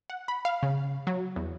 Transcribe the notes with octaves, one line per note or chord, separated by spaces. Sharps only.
F#5
B5
F5
C#3
F#3
E2